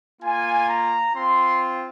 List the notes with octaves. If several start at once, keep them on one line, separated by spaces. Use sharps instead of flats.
A#3 F4 G#5
A#5
C4 F4 C6